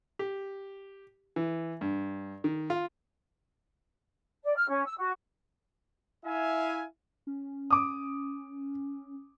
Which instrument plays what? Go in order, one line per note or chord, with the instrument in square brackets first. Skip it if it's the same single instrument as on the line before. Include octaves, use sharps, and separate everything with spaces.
[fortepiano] G4
E3
G2
D#3
F4
[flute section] D5
F6
C#4
E6
F#4
[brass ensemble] E4 E5 F5 G#5
[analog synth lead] C#4
[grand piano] D6 D#6